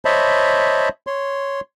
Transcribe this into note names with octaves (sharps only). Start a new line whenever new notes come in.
C5 C#5 D#5 E5 A5 B5
C#5 C6